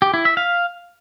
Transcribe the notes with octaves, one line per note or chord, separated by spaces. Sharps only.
G4
E4
E5
F5